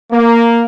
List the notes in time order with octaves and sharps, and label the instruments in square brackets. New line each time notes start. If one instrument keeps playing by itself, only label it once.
[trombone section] A#3